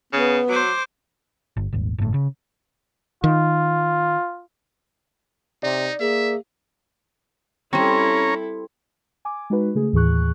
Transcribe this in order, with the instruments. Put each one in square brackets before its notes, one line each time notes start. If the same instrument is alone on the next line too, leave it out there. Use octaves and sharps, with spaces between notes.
[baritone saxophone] C#3 [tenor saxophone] B3
[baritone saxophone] F#3 [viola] C5 D6
[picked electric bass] G1
D#1 G#1
G1 A2
C#3
[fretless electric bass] D#3 [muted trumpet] F4
[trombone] C3 [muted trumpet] D#4 [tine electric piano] D5
[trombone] A#3 [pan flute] G#4 [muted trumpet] E5
[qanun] G3 C4 [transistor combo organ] C#4 C#5 A#5 [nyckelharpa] E4 A4
[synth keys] G#5 D6
G#3 D#4 F#4 B4
C#3 A3 G#4
D#2 A2 E3 G#4 C#6 F#6